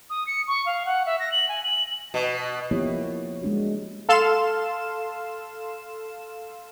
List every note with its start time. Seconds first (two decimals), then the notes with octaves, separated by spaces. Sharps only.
0.10 D#6
0.27 C#7
0.48 C#6
0.66 F5
0.86 F#5
1.06 E5
1.20 A#6
1.32 F#7
1.49 G#5
1.63 F#7
2.14 B2
2.71 F3 A#3 B3 E4 G4 C#5
3.42 G#3 D4 F#4
4.09 A4 F5 C6 E7